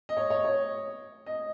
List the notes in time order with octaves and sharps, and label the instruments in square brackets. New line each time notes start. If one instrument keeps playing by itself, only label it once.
[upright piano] D#5
C#5
C#5
C#5
D#5